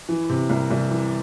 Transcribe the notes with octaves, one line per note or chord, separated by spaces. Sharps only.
E3
C3
C2
C2
E3